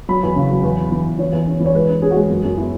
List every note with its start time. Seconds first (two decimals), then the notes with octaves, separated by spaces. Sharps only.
0.09 F#3 B5
0.23 E2
0.36 C#3
0.51 F#3
0.64 E2
0.78 B3
0.92 E3
1.06 E2
1.19 E3 C#5
1.33 E2
1.47 C#4
1.60 E3
1.66 C#5
1.74 G#3 B4
1.88 C#4
2.02 C#4 G#4
2.11 F#4
2.16 G#3 G#4
2.30 F#2 F#4
2.44 F#2
2.57 B3 E4